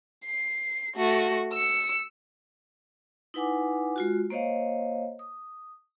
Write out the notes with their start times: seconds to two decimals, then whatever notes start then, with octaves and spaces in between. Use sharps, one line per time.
0.25 C7
0.96 A3 F#4
1.53 E6 C#7
3.34 D#4 E4 B4 F#5 G#5 D6
3.96 G#3 F4 F#4
4.30 A#3 C5 C#5 D#5 F5
5.19 D#6